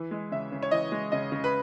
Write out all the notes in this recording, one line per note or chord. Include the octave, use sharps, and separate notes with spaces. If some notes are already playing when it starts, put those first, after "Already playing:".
Already playing: E3
G#3
C#3 E5
C#3
C#5
E3 D#5
G#3
C#3 D#5
C#3
B4